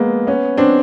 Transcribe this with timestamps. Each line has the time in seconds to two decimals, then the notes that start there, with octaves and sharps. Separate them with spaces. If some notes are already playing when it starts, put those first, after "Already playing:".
Already playing: G#3 A#3 B3
0.27 B3 C#4
0.58 C4 D4